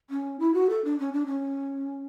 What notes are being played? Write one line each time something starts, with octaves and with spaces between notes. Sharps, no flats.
C#4
E4
F#4
A4
D4
C#4
D4
C#4